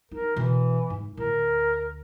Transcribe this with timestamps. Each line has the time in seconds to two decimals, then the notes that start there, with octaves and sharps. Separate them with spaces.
0.11 D#4 A#4
0.36 B2 E3
0.90 G#2
1.17 D2 A2 A#4